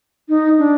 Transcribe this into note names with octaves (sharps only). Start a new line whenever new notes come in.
D#4
D4